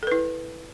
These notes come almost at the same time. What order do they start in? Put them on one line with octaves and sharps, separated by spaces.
A4 B4 E4